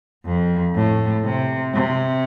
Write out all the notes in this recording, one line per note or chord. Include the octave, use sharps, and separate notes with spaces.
F2
A2
C3
C3